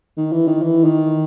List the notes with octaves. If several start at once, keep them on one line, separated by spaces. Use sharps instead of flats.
D#3
E3
D#3
E3
D#3